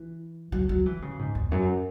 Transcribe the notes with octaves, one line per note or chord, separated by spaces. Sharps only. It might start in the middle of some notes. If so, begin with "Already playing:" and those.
Already playing: E3
F#3
F#3
E3
C#3
G#2
E2
F#2